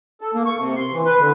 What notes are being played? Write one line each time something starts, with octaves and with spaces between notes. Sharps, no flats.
A4
A#3
C#6
C3
C6
E3
B4
D3